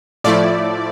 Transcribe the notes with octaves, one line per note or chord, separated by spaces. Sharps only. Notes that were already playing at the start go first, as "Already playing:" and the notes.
A2 F3 A3 E4 D5